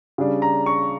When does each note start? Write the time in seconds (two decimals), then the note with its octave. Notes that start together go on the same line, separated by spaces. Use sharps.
0.18 C#3 G3 D4
0.42 A#5
0.66 C#6